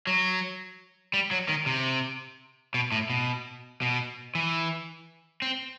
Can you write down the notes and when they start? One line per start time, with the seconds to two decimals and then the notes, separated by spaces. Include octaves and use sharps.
0.07 F#3
1.14 G3
1.31 F#3
1.49 D#3
1.66 C3
2.74 B2
2.92 A2
3.10 B2
3.82 B2
4.35 E3
5.42 C4